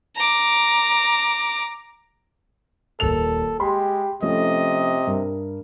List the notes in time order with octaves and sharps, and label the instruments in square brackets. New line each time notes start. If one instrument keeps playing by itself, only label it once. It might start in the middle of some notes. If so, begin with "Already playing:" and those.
[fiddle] A#5 D6
[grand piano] D#1 A#4 F7 [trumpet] A4
[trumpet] G#3 [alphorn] G4 [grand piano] B5 C6
[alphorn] C3 [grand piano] F3 A3 C#4 [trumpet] D#5
[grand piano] G2 A#4